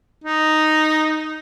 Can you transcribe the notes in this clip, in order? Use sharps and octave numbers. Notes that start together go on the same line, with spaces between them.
D#4